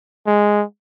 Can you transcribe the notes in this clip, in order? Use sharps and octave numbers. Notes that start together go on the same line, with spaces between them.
G#3